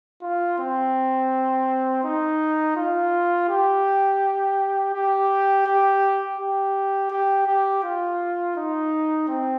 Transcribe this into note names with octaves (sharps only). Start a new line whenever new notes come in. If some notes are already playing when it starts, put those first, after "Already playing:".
F4
C4
D#4
F4
G4
G4
G4
G4
G4
G4
F4
D#4
C4